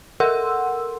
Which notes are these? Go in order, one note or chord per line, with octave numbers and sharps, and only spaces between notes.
A4 A#4 F#5 C6 E6